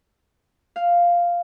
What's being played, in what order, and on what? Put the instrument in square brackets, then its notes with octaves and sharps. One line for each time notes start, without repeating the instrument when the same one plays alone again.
[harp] F5